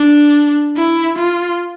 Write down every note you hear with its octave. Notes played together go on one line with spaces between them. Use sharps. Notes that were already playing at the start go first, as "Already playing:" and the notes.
Already playing: D4
E4
F4